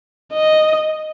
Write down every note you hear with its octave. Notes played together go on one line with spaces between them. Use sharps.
D#5